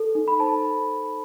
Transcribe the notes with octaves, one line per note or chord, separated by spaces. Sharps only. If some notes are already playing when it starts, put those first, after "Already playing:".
Already playing: A4
D#4
B5
C5 A5